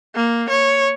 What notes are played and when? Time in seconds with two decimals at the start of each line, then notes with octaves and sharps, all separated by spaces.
0.15 A#3
0.50 C#5